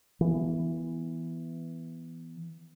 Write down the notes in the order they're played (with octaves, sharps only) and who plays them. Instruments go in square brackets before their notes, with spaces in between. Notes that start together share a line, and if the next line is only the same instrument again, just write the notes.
[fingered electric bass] E3 B3